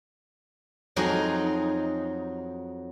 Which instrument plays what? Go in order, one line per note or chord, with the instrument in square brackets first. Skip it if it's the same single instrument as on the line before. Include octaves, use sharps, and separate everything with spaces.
[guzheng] F2 F#3 D#4 G#4